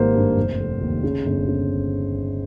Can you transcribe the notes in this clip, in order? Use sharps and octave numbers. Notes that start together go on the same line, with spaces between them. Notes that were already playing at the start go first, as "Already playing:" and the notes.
Already playing: G#1 G3 A#3 C5
G2
F1
F1
D#2
C#3
G1
C#3